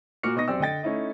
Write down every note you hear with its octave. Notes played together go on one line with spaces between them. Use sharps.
A#2 A#3 F#4 D6 F6 C#7
B2 B3 D#4 C#6 D#6 A#6
F#2 C4 G4 C5 D5 E6
D3 D#5 G5 A6
A3 C#4 D#4 E4 D#5